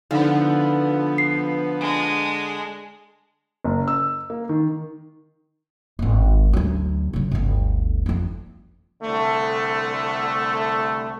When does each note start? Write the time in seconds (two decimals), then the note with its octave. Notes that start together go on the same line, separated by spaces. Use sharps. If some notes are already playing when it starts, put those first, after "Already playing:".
0.11 D3 F3 B3 D#4
1.18 C7
1.80 G#3 D4
3.65 F#1
3.88 E6
4.30 A#3
4.49 D#3
5.99 D#1 G#1
6.53 D2 F#3
7.13 C#3 F#3
7.31 G1 D2
8.06 F2 F3
9.02 C2 D3 A3